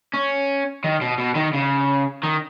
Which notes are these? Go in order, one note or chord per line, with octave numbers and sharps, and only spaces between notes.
C#4
D#3
B2
B2
D#3
C#3
D#3